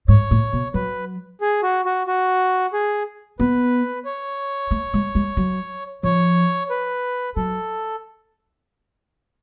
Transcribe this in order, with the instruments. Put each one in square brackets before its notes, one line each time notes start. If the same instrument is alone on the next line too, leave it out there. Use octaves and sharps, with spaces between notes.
[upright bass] G#2 [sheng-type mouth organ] C#5
[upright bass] A2
B2
[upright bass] F#3 [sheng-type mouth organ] B4
[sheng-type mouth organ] G#4
F#4
F#4
F#4
G#4
[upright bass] B3 [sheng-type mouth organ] B4
[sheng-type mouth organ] C#5
[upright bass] A3
G#3
G#3
F#3
[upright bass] F3 [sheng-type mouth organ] C#5
[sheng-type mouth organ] B4
[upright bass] F#3 [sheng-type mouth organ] A4